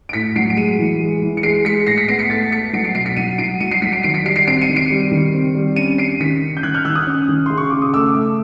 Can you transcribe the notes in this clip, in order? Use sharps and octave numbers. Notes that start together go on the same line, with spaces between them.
D7
A2 B6 C#7
F#3 C7 D7
D7
G#3 C#7 D#7
E3
G#3
E3
C#7
G#3 C7 D7
G#3 B6 C#7
A2 A#6 C7
B6 C#7
B3 C7 D7
B6 C#7
A3 A6 B6
A3 B6 C#7
F#3 C7 D7
C7 D7
B2 C7 D7
B6 C#7
F#3 C#7 D#7
F#3 C7 D7
F#3 C#7 D#7
C7 D7
F#3 B6 C#7
C7 D7
D#3 C7 D7
B6 C#7
G3 C7 D7
C7 D7
C4 C7 D7
C#7 D#7
D#3
C7 D7
G3
D#3
C4
G3
C#4 C#7 D#7
C#4 C7 D7
D#3 B6 C#7
C#4
G6
D#3 F#6 G#6
F6 G6
D#3 E6 F#6
D#6 F6
C#4
D#3
C#3 C6
C#6
C#3 D6
D#6
A3 D6 E6
A3